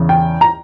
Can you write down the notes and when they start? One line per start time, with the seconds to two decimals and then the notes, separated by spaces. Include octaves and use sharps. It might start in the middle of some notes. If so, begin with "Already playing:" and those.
Already playing: E2 C#3 E3
0.09 G5
0.41 A#5